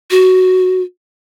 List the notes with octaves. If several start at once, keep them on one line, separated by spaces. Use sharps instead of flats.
F#4